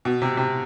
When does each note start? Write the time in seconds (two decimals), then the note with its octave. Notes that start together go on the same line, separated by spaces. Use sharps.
0.05 B2
0.22 C3
0.37 C3